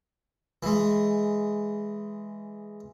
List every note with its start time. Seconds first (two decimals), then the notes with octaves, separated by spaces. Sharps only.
0.63 E3 G#3